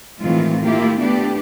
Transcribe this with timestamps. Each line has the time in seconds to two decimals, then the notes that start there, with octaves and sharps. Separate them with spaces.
0.20 A2 D#3 E3 G#3 C4 F4
0.64 A#3 E4 F4 G4
0.97 A3 B3 D4 G4